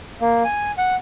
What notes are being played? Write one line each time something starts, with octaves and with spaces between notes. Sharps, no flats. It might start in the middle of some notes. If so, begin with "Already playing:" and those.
A#3
G#5
F#5